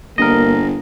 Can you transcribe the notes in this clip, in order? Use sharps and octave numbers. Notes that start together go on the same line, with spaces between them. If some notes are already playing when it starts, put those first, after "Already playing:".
G1 A#3 A#4 D#5